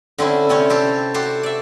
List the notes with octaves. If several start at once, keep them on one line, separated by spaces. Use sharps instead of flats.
D3 C4 C#4 E4
C3 C4 C#4 C#5
C4 G4 A4
F#4 G4 A4 C5
D5 E5